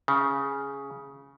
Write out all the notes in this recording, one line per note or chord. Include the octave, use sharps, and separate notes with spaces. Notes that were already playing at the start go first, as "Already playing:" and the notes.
C#3